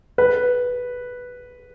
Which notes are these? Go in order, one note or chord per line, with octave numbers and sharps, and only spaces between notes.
B4